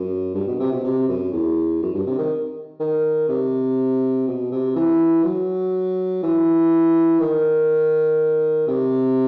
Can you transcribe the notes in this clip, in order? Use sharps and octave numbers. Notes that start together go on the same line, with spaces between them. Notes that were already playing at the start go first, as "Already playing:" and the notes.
Already playing: F#2
G2
B2
C3
B2
C3
F#2
E2
F#2
G2
C3
D#3
D#3
C3
B2
C3
E3
F#3
E3
D#3
C3